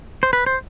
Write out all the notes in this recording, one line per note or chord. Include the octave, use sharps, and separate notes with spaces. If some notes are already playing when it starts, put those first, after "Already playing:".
C5
B4
C5